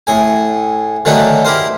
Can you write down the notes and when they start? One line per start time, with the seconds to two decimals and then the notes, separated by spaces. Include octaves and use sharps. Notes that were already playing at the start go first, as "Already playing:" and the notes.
0.07 A2 G#4 G#5
1.05 D3 D#3 F#3 A3 G#4 B4
1.45 E4 G4 A#4 C5